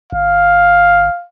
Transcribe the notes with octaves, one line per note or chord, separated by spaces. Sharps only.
G1 F5